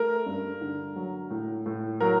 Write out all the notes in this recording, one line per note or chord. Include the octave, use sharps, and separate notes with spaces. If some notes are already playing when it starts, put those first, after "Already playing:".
Already playing: A3 A#4
G2
D3
F#3
A2
A2
F#3 A#4